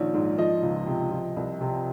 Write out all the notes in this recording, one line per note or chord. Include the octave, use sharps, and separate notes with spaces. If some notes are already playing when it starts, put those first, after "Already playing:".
Already playing: A#1 D#3 C#5
G#2
F3 D#5
C#2
C3
F3
C2
C3